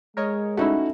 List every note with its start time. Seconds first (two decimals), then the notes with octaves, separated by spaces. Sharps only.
0.17 G#3 A#4 C#5 D#5
0.57 A3 C#4 D#4 E4 F#4